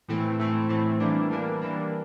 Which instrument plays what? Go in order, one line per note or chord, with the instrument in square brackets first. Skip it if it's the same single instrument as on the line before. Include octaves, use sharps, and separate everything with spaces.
[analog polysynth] A2 E3 A3 C4
A2 E3 A3 C4
A2 E3 A3 C4
E3 G3 A#3 D4
E3 G3 A#3 D4
E3 G3 A#3 D4